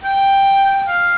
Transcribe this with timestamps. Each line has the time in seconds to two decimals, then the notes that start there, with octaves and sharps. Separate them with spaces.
0.04 G5
0.87 F5